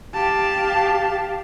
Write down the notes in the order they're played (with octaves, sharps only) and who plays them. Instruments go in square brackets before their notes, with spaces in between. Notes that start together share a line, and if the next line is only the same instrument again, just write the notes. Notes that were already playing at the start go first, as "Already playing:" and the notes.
[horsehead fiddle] G4 F5 [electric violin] A5